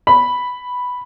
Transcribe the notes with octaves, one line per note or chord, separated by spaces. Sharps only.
B5